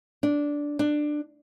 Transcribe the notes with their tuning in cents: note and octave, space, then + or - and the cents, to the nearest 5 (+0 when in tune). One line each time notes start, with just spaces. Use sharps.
D4 -10
D4 +15